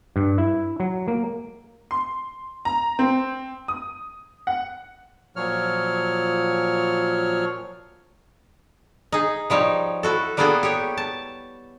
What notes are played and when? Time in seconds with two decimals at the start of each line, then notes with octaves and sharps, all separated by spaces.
0.16 G2
0.38 E4
0.80 F#3
1.08 A#3
1.91 C6
2.65 A#5
2.99 C4
3.68 D#6
4.47 F#5
5.36 A#2 F3 F#3 C#5 F6
9.12 D#4 G#4
9.50 F3 G3 D#4 C#5
10.03 E4 F#4 A4
10.37 G3 A#3 B3 F#4 G#4 A4
10.63 G4 C#5
10.97 A5